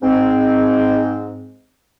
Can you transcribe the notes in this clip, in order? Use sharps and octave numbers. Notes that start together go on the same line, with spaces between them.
G#2 C4